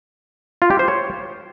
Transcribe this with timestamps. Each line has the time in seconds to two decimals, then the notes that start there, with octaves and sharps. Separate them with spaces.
0.62 F4
0.70 G4
0.79 C5
0.88 C#5